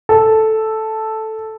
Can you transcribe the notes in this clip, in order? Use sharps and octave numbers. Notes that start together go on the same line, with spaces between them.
A4